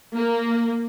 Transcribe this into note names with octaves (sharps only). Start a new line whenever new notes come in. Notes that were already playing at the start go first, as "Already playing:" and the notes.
A#3